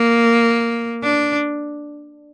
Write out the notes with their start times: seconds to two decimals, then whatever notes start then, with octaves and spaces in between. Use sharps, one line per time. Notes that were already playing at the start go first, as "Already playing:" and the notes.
Already playing: A#3
1.03 D4